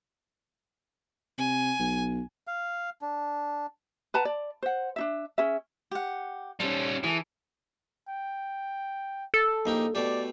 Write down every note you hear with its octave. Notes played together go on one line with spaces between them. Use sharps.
C3 G#5
B1
F5
D4
B4 F#5 A5 A#5
D5
C5 F#5
D4 D#4 E5
C#4 G#4 E5
G4 F#5
G3 C#4 A4 C5
E3 G#4 A4
G5
A4
A#1 A#3 D#4 G4
B2 A3 G4 D5